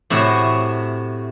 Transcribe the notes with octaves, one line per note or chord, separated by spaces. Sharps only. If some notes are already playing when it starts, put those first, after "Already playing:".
A2 C3 E4 F#4 E5